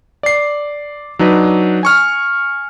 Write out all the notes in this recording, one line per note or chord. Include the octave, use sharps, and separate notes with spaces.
D5 C7
F#3 D4 D#4 B4
G#5 C#6 F6